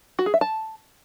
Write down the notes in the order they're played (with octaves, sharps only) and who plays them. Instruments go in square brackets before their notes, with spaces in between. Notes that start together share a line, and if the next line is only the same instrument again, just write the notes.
[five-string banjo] F#4
G#4
E5
A5